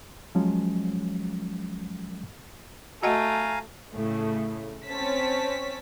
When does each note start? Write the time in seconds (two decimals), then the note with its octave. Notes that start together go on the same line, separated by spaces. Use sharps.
0.35 F3 F#3 G#3 C#4
3.03 A3 F#4 D#5 F5 F#5 G#5 A#5
3.94 A2 C#3 A3
4.86 C4 C#4 C#5 A5 B6